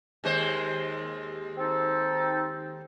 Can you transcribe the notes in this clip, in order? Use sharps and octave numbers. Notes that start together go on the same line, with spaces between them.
D#2 G#3 C5
C4 D#4 A4